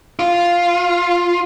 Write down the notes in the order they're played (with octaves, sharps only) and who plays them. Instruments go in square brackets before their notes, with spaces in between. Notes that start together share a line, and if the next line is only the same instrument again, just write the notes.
[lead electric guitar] F4